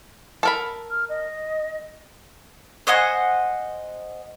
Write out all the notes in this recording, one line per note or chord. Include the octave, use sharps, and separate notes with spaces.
A4 A#4 B5
F6
D#5
C5 D#5 F#5 G#5